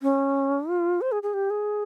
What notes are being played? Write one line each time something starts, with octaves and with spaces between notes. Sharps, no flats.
C#4
F4
C5
G#4
G#4
G4
G#4